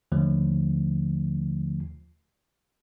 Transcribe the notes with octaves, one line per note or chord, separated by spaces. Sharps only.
D#2 D3 F3 A3